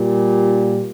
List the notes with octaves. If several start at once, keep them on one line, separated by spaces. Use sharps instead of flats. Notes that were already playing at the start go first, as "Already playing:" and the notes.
Already playing: A#2 G3